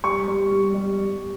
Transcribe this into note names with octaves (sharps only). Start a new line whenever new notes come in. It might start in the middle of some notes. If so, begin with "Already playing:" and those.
G3 C#6
G3
G3
G3
G3